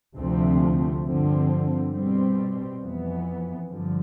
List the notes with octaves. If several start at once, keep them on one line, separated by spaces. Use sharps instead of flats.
D2 C3 F3 A3 C4
G2 D3 F3 C4
B2 G3 C4
F2 E3 B3
G2 D3 F3